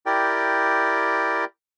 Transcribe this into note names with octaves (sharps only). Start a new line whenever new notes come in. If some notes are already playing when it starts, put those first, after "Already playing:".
E4 G4 A#4 D5 G5